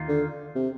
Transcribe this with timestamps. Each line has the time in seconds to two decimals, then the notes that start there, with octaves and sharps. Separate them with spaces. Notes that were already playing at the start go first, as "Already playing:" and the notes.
Already playing: D#2 D#3 A#3 F4
0.08 D3
0.55 C3